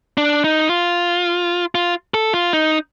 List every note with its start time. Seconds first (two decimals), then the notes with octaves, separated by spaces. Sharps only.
0.18 D4
0.44 D#4
0.69 F4
1.75 F4
2.14 A4
2.33 F4
2.53 D#4